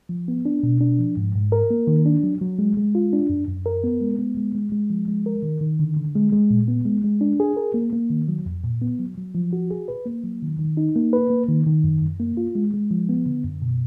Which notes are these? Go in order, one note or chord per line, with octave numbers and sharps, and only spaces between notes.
F3
B3
D4
B2
D4
F3
G#2
G#2
A#4
A#3
D#3
D4
F#3
F#3
G#3
G#3
F4
D4
F#2
F#2
A#4
B3
G#3
B3
G#3
G#3
G#3
F3
G#3
A#4
D#3
D#3
D3
D3
G#3
G#3
A#2
B3
G#3
G#3
D4
G#4
A#4
A#3
A#3
D#3
F#3
F2
A#2
B3
F#3
F#3
F3
F#4
G#4
B4
A#3
F#3
D#3
D#3
D#4
A#3
B4
A#3
D#3
D#3
F#2
F#2
A#3
F4
G#3
G#3
F3
B3
D3
F#2
B2